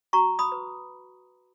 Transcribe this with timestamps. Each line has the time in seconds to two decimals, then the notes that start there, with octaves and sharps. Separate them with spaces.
0.13 F#4 A#5 C#6
0.39 B5 D#6
0.52 B4